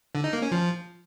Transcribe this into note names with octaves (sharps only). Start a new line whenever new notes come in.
D3
D#4
A#3
C#4
F3